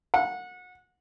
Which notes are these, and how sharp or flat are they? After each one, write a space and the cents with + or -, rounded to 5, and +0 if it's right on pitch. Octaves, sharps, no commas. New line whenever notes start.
F#5 -25